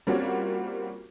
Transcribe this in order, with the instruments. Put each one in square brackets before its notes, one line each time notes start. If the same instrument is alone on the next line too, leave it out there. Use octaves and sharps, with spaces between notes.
[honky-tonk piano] G3 A#3 C4 C#4 F4 F#4